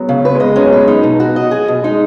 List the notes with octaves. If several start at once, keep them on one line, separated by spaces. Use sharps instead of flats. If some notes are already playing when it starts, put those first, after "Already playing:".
Already playing: F#3 G#3 B3 C#4
C#3
C#4
F#3 B3 B4
G#3
D#5
G#3
F#3 B3 C#4
F#3 B3
G#3 B4
F#3 D#4
B2
F#4
D#5
G#4
B2
G#3 D#4